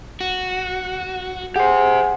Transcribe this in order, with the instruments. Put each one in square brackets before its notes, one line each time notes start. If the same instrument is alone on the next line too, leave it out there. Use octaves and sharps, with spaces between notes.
[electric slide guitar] F#4
[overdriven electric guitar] G4 C5 [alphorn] G#4 [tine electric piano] F#5